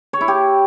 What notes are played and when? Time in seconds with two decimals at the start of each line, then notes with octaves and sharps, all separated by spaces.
0.13 C#5
0.21 E4
0.28 G4